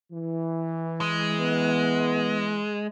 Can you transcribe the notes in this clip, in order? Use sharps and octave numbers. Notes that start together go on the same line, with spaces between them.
E3
G#3
B3